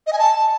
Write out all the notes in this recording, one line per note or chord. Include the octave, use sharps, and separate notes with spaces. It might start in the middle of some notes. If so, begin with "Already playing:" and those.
D#5
G#5
A5